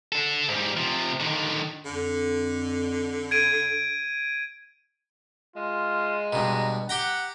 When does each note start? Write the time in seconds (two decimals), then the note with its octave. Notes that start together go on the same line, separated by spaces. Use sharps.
0.12 D4 A4
0.48 G#2 G3
0.77 C3 F3
1.20 D3 D#3
1.85 F2 D3
3.31 G#6 D7 D#7
5.56 G#3 F4
6.33 G2 B2 A#5
6.89 G4 F#5 G5 A#5